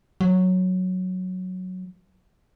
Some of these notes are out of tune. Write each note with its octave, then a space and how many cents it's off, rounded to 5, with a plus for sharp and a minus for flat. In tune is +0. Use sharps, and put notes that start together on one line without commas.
F#3 -5